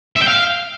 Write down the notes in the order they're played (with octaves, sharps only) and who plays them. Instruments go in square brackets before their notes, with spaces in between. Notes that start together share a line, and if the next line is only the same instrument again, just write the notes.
[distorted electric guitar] E5
G5
F5